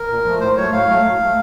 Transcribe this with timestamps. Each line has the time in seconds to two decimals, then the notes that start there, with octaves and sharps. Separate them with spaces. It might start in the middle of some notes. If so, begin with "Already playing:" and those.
Already playing: A#4
0.10 A#2
0.25 F3 A3
0.40 A2 C5
0.57 F#3 A3 C#5
0.73 A2 F5
0.88 F#3 A3
1.04 A2
1.20 F#3 A3